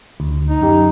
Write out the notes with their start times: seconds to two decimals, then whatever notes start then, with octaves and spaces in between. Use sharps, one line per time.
0.20 D2
0.48 D#4
0.61 F#2 G4